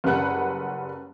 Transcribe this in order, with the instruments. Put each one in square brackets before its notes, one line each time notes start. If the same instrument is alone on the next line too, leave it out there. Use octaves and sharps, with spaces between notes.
[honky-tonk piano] F#1 F#2 G3 B4 F#5 F#6